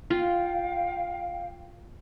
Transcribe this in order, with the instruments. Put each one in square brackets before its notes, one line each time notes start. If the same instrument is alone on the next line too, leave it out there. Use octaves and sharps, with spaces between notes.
[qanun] F4 [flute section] F5 G5